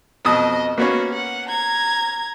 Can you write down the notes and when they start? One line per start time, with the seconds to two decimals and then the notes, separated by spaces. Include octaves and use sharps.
0.25 F2 B2 D#5 D#6
0.78 A#3 B3 C#4 F#4
1.13 F#5
1.49 A#5 G#6